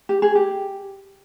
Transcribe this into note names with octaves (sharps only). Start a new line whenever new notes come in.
G4
G#4
G4